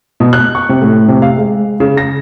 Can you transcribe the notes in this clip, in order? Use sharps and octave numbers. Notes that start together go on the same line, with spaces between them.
B2
F#6
C#6
C3
A2
C3
F5
G#3
C#3
A#6